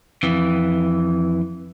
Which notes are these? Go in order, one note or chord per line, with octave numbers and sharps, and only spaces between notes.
F2 E3